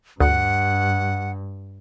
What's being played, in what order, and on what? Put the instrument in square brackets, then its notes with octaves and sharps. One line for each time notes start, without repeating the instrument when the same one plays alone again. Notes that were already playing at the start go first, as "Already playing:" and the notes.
[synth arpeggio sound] D2 [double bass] G2 [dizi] F#5